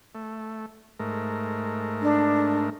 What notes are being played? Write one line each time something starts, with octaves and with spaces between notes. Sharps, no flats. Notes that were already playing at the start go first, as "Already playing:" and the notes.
A3
G#2 A3 A#4
D4